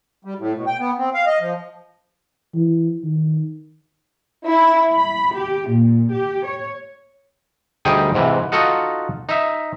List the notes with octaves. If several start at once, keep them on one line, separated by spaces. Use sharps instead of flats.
G3
A2
B2
G5
B3
C4
F5
D#5
F3
E3
D#3
E4
B5
G4
A#2
G4
C#5
D2 G3 D#4 G#4 G5 G#5
G#2 C3 E3
D#4 F4 F#4 A4 D#5 F#5
D#4 E5